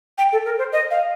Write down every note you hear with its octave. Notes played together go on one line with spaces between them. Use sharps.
G5
A4
A#4
C5
D#5
F5